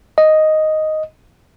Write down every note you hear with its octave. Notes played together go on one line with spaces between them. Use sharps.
D#5